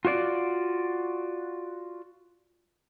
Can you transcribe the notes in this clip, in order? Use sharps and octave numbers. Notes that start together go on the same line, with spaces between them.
F4 F#4 C#5 D5